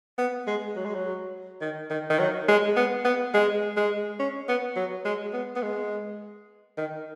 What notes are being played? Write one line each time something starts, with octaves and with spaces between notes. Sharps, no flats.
B3
G#3
F#3
G#3
F#3
D#3
D#3
D#3
F#3
G#3
B3
B3
G#3
G#3
C#4
B3
F#3
G#3
B3
B3
G#3
D#3